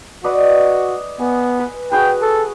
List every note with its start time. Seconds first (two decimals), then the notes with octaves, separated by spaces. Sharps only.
0.24 F#4 B4 D5 D#5
1.20 B3 G#5
1.59 B4
1.92 F#4 G#4 B4 G5
2.22 A4